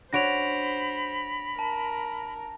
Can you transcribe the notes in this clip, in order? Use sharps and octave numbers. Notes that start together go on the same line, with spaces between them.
D4 F#4 C5 C#5 B5 A#6 D7 F7
A#4 A5